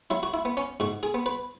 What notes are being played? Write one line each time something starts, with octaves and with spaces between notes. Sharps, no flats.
F#3 E4
F#4
E4
B3
C#4
G#2 F#4
G#4
B3
B4